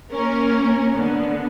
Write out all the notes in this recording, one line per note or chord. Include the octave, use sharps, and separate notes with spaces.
A#3 C#4 A#4
D3 B3